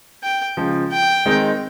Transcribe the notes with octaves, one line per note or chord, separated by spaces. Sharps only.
G5
C#3 F3 G#3
G5
D#3 G#3 C4 D#4